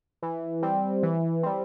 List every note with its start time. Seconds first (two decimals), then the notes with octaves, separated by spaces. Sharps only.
0.22 E3
0.63 G3 C4
1.03 E3
1.43 G3 C4